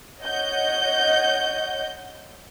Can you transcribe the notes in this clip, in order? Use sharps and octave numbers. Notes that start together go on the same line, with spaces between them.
C#5 D#5 F#5 G6